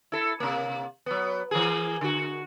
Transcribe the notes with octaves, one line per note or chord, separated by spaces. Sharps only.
E4 A4
C3 A#3
F#3 B3
E3 A#3 G#4
D3 F#4